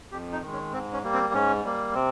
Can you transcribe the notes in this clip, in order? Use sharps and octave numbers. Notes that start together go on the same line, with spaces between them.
F2 G4
D#4
D#3 G#3
C#4
G#2 C4
C#4
G3 A#3
C4
G#2 C#4
G3 A#3
C3 C4